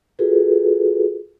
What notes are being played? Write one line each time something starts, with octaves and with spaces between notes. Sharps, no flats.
F4 F#4 G#4 A4 B4